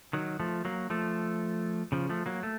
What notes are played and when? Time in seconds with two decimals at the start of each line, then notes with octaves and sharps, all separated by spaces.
0.13 D#3 F#3
0.40 F3 A3
0.65 F#3 A#3
0.90 F3 A3
1.92 C#3 F3
2.09 F3 A3
2.26 F#3 A#3
2.43 A3